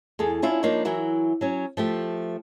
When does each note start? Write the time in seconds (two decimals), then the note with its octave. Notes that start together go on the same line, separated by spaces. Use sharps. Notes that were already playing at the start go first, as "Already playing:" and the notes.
0.19 E2 G#4 A4
0.42 C#4 D4 E4 F4
0.63 F3 A#3 D4 D#4 C#5
0.85 E3 F#3 E4 F#4 A#4
1.41 F#3 C#4
1.77 F3 A3 G4